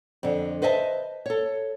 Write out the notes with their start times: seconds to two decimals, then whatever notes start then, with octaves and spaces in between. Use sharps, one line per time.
0.23 F2 D3
0.62 B4 C5 D#5 E5 G#5 A5
1.26 A4 C#5